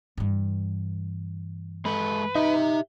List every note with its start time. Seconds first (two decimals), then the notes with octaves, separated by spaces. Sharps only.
0.17 G2 E3
1.85 G#3 A4 B4
2.35 D#4 G4 E5